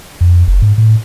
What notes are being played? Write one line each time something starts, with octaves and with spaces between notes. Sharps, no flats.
F2
F#1
G#2
A2